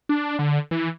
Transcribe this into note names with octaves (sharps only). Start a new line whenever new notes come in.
D4
D3
E3